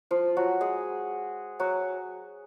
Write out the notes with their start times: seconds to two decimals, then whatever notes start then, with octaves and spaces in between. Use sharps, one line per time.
0.11 F3 F4
0.36 F#3 F#4
0.61 G#3 G#4
1.59 F#3 F#4